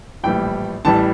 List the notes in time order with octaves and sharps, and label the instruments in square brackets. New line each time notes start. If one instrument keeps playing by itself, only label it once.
[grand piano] A#1 A2 E3 G3 G5
A1 A2 E3 G3 A5